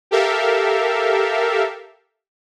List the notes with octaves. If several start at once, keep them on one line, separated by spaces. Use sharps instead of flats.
G4 A4 A#4 E5 F5